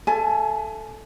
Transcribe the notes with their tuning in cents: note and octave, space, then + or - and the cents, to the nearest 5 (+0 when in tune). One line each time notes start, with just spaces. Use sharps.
A4 -5 E5 +30 G#5 +20